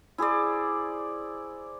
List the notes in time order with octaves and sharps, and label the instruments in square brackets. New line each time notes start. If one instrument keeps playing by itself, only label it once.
[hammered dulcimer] E4 G#4 C5 D5